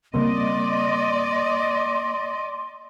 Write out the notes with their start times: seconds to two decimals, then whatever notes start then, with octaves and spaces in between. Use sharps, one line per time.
0.14 C#3 G3 A#3 C4 D5 D#5 C6